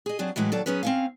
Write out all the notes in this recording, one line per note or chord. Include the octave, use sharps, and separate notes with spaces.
G#4 D#5
F#3 C4 D4 G#4
A2 E3 F#3 G#3 E4 F#4
D#2 F#3 A4 D5
F#3 B3 C#4 G#4 B4
C4 C#4 F5